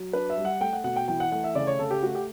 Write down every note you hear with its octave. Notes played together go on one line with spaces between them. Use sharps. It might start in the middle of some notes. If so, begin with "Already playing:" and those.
Already playing: F#3
D4 B4
E5
G3
F#5
A3 G5
F#5
B2 F#5
G5
E3 G5
F#5
A3 F#5
E5
C#3 D5
C#5
C#3 A4
G4
A3 F#4
G4